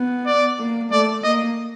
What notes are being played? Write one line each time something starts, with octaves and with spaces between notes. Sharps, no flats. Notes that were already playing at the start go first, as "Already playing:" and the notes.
Already playing: B3
D5
A#3
A3 D5
A#3 D#5